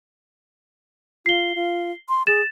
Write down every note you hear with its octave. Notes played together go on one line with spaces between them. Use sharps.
F4 C7 G7
F4
C6
G#4 A6 E7